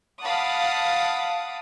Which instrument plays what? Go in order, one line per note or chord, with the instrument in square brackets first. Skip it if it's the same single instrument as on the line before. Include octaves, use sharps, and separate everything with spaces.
[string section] F5 F#5 A5 B5 D6 D#6